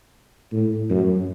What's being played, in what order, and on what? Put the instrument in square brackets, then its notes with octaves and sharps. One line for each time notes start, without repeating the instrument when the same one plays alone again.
[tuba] A2
F#2